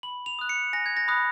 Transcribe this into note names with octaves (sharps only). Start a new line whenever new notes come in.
B5 F#7
F7
D#6 F#6
C#7
G#5 A#6
G#6
A#6
B5 D#6 F#6